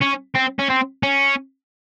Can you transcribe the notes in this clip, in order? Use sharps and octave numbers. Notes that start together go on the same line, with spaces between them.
C#4
C4
C#4
C4
C#4